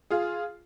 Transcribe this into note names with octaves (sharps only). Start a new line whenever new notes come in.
F4 G#4